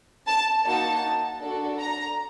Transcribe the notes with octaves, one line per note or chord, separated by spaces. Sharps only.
A5
A#3 D#4 F#4 A5
D4 F#4 A4
A#5